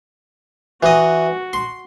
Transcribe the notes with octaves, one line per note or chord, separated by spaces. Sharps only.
E3 F#4 D#5
C6